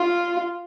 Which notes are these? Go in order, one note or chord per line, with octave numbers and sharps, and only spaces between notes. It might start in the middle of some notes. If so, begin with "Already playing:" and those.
Already playing: F4